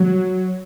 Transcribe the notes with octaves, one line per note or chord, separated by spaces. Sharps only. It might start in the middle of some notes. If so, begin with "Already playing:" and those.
Already playing: F#3